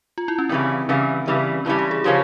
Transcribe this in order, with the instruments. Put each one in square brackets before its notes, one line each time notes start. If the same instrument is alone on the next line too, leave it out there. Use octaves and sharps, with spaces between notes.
[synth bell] F4
E4
C#4
[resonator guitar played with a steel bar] C#3 E3 G3 [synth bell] C4
[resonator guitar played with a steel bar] C#3 E3 G3 [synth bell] C#4
[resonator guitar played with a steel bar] C#3 E3 G3
[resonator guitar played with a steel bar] C#3 E3 G3 [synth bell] E4
[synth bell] G4
G#4
[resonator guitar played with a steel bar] C#3 F3 A#3 C#4 [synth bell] G4